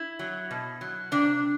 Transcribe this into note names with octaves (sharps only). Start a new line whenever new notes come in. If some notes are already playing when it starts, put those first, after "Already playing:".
Already playing: E4
F#3
B2
F#3
C3 D4